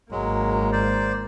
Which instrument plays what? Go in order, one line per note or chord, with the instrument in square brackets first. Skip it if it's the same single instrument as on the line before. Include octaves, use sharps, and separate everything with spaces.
[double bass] G#1 A#3 [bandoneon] F#3 G#3
[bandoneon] C5 D5